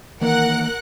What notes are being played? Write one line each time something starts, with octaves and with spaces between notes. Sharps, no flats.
D#3 E3 A#3 A#4 F#5 F#6